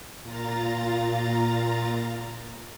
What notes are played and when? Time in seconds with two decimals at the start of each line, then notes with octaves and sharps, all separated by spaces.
0.22 A#2 F4 A#5 A6